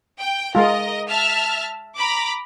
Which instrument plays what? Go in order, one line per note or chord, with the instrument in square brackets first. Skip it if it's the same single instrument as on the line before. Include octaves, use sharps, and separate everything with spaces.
[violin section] G5
[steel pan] G#3 F4 [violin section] A#4 D#5
[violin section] E5 A5 F6
A#5 B5 D6